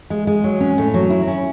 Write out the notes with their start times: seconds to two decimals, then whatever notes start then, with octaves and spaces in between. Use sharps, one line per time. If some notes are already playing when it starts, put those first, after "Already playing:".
0.10 G#3
0.27 G#3
0.44 F#3
0.60 C#4
0.78 A2
0.94 F#3
1.10 E4
1.27 C#4